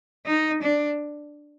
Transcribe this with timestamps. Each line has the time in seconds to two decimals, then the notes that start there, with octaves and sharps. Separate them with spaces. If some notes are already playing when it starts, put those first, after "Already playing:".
0.26 D#4
0.62 D4